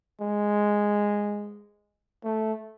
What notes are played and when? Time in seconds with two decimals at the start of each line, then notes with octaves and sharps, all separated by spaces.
0.21 G#3
2.24 A3